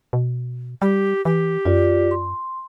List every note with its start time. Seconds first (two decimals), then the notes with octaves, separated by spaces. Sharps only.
0.13 B2
0.82 G3 G4
1.25 E3 G4
1.65 F#2 F4 D5
2.11 C6